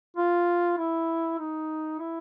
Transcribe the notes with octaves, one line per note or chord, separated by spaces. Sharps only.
F4
E4
D#4
E4